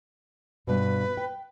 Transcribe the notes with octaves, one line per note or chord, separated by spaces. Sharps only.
G2 B2 B4
G5